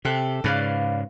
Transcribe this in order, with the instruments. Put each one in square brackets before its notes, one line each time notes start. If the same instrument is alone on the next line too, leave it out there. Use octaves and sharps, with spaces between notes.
[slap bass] C3 [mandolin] A4 G5 F#6
[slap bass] G#2 C#3 [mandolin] B4 D5 F5